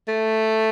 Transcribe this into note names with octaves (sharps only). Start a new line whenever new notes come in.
A3